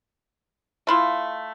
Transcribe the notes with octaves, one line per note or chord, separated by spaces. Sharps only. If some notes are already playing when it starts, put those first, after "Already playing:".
A3 E4 F4